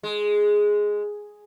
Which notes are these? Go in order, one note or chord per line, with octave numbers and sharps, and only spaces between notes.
G#3